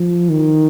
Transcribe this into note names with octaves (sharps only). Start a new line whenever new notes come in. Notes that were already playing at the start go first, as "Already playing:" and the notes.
Already playing: F3
D#3